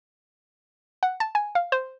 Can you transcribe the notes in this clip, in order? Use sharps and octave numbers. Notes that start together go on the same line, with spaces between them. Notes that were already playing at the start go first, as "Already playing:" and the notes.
F#5
A5
G#5
F5
C5